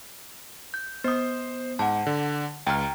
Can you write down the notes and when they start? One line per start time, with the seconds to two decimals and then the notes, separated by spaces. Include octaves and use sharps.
0.74 G6
1.04 B3 C5 D#6
1.79 G#2 F#5 A5
2.07 D3
2.67 C#2 G5 A#5 F6